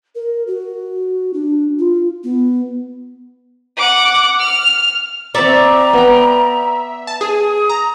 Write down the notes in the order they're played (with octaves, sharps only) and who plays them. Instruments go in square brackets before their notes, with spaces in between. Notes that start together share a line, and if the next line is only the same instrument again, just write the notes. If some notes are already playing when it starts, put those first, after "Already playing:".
[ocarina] A#4
F#4
D4
F4
B3
[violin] F#5 D6
F6
[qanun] C4 C#6 [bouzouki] D5 [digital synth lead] E5 [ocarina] A#5
[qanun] B3 G5
[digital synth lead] A5
[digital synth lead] G#4 [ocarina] D#6
[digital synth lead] A#5